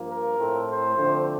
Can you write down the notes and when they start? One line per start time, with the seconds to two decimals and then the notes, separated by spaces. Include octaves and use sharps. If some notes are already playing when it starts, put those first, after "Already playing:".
Already playing: G2 F3 A#3
0.09 A#4
0.38 A2 A3 C4
0.67 C5
0.96 D3 F3 A3 C4